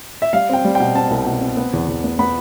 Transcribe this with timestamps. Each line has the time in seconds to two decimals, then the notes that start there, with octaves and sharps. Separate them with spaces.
0.22 E5
0.33 G3 F5
0.49 C4 G5
0.64 G3
0.75 B2 G5
0.95 C4 A5
1.11 C2
1.26 B2
1.41 C4
1.57 B3
1.73 E2
1.88 E2
2.04 B3
2.19 B3 B5